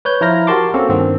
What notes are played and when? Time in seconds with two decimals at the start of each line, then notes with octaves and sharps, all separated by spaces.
0.05 B4 C#5 G6
0.21 F3 E4 F4 A#5 F6 A#6
0.47 F#4 G4 A#4 A5 C6 D6
0.74 A#3 C4 C#4 F#4 A4
0.89 G2 D#3 C4